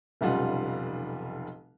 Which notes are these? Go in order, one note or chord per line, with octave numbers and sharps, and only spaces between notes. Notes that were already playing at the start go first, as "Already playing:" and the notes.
F1 B1 C#3 G3 F4 F#5